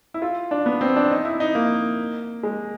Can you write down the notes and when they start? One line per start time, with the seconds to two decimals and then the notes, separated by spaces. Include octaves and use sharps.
0.14 E4
0.22 F4
0.51 D4
0.66 B3
0.81 C4
0.96 D4
1.11 D#4
1.25 E4
1.40 D#4
1.55 A#3
2.43 G#3